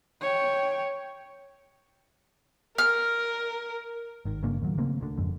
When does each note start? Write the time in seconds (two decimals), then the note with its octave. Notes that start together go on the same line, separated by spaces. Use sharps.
0.21 C#5 G5
2.78 A#4 F6
4.25 G#1 D#3
4.43 G1 C#3 A#3 D4
4.62 D#2 A2 F#3
4.78 C#3 A3 A#3 C4
5.01 D2 D3
5.17 F#1 F2 G#2 D3